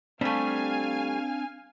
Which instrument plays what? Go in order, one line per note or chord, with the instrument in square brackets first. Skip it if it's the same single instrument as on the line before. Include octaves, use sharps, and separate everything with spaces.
[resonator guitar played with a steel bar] G3 A3 [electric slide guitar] C4 D4 [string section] F5 G#5 F6